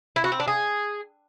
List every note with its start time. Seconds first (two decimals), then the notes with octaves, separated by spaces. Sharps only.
0.16 E4
0.24 F#4
0.32 C4
0.40 D4
0.48 G#4